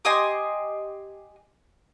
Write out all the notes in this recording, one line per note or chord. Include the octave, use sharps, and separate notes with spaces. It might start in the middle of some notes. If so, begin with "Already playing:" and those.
G4 D#5 G#5 C6